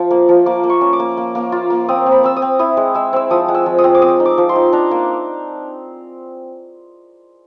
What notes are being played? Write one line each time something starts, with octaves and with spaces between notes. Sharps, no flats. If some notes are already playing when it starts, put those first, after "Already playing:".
Already playing: F3 F4
A#3
F3
A#3 D6
A#3
C#6
C#4
D6
A#3
A#3
A#3
F4
A#3
C4 D#6
C4
B5
C4 E6
D#6
C4
E4 D#6
G#3
G#3 E6
C4 E6
F3 D#6
G#3
E6
F3
D#6
C4
D6
C4 D#6
D#4
D6
F3
C6
D#4
D4 A#5
A#3